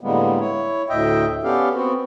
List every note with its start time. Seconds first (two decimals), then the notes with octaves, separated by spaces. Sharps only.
0.01 A2 D3 G3 G#3 A#3 B3
0.40 E4 C#5
0.90 D2 A2 D#5 E5 G5
1.44 B3 C#4 G4 A4 D5 F5
1.74 B3 C4 F#4